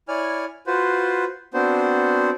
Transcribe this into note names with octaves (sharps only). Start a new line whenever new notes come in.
E4 C#5 D5 G#5 F6
F4 F#4 B4 C5
B3 C4 D4 F#4 C5